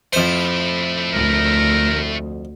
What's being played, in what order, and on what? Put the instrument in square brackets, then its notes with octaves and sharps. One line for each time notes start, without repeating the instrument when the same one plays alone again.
[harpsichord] F2 C5 [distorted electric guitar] A3 E4
[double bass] D2 [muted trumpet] A#4